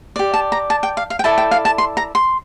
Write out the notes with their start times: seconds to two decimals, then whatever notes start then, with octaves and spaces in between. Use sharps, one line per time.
0.16 G4 D5
0.34 A5
0.52 A#5
0.70 A5
0.83 G5
0.97 F5
1.10 F5
1.19 G5
1.24 E4 A4 D5 A5
1.38 G5
1.51 F5
1.65 A5
1.78 C6
1.97 A#5
2.15 C6